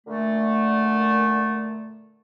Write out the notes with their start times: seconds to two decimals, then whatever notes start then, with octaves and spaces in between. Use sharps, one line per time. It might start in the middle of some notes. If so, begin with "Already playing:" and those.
0.06 A#2 D3 A3